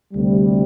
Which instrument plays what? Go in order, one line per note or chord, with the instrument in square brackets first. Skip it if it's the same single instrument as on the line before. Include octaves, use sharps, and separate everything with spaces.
[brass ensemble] D2 C3 G3